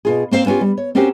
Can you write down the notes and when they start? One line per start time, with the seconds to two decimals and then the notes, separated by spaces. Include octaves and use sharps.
0.05 B2 F4 G#4
0.31 A#3 C4 C5 F5
0.46 B3 C#4 D#4 F4 G4
0.61 G3
0.77 C#5
0.95 C4 C#4 F#4 G4 A#4 C5